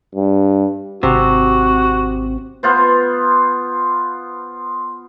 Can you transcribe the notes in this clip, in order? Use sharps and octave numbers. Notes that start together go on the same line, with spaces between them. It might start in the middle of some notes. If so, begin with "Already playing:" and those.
G2
G#1 C3 C4 F#4
B3 F4 C5